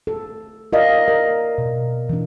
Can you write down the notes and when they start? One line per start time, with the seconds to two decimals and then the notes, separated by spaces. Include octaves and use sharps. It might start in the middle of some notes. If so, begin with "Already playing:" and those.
0.07 A4
0.73 A#4 D5 D#5 F5
1.08 A#4
1.58 B2
2.09 E3 D4